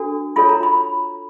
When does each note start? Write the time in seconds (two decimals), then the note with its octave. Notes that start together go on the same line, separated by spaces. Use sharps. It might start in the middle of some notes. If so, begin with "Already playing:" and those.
Already playing: D4 F#4 A4
0.36 F4 A4 C#5 B5
0.49 A#5
0.63 B5